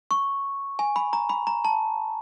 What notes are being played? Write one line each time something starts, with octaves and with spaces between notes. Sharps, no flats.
C#6
G#5
B5
A#5
B5
A#5
A5